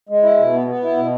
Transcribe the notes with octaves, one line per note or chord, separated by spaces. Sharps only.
G#3
E4
B2
B3
B3
E4
B2